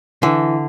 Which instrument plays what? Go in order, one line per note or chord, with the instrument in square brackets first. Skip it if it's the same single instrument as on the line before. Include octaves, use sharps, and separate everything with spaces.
[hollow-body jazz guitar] D3 [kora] E3